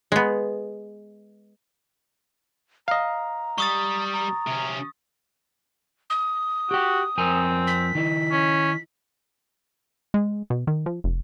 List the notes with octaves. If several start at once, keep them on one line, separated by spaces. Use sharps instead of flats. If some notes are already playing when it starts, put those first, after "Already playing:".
G#3 B3
D#5 F5 A#5
G3 C#6 D#6 A6
A#5
C3 C#4
D#6
F#4 G4 G5
F2 C4 A#4 G#5
B6
D#3 D#4 E4
C#4
G#3
B2
D#3
F3
F1